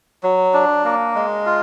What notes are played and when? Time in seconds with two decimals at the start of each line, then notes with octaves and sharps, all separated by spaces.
0.23 F#3
0.53 D4
0.84 A#3
1.15 G#3
1.46 F4